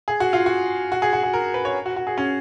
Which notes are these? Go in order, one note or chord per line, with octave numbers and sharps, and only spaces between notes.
G#4
F#4
F4
F#4
F#4
G#4
F#4
G#4
A#4
B4
C#5
F#4
F#4
G#4
C#4